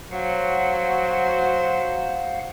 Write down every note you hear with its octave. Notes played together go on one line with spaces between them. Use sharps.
F#3 F#4 C5 F5 F#5